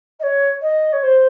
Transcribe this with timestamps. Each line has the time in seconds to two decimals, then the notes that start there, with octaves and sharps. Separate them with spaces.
0.19 D#5
0.23 C#5
0.61 D#5
0.92 C#5
1.02 C5